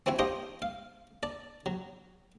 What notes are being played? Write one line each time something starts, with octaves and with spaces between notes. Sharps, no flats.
C4 C#4 E4 F#4 G#5
D4 F4 G4 C5 D#5
F5
D5 A5
F#3